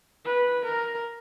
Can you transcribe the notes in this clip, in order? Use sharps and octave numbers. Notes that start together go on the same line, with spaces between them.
B4
A#4